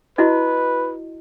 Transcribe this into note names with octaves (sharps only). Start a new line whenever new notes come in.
E4 F#4 B4 D#5